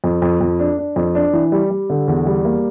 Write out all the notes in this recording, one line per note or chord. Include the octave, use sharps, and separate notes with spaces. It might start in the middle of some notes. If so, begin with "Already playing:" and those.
F2
F2
F2
D4
D4
F2
D4
E3
G3
G3
D3
E2
G3
A#3